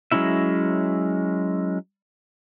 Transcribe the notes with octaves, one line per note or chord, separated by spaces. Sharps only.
F#3 G#3 C#4 E4 E5